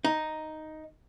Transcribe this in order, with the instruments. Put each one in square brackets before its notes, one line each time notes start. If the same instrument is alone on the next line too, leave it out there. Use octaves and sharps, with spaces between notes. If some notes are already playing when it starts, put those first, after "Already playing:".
[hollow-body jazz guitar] D#4